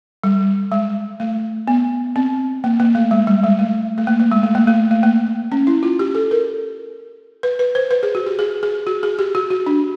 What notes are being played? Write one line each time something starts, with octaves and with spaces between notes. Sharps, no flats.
G3
G#3
A3
B3
C4
A#3
A#3
A3
G#3
G3
G#3
A3
A3
A#3
A#3
G#3
A3
A#3
A3
A3
A#3
C#4
E4
F4
G4
A4
A#4
B4
B4
C5
B4
G#4
F#4
G4
G#4
G#4
F#4
G#4
G4
F#4
F#4
D4